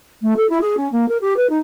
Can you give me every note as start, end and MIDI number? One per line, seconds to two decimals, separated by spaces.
0.21 0.33 57
0.36 0.48 69
0.49 0.58 64
0.61 0.74 68
0.77 0.88 61
0.91 1.05 58
1.08 1.17 70
1.21 1.33 67
1.36 1.46 71
1.49 1.58 63